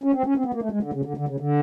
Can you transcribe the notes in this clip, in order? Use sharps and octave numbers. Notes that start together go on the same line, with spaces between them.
C#4
C4
C#4
C4
B3
A#3
A3
G#3
D3
C#3
D3
D3
C#3
D3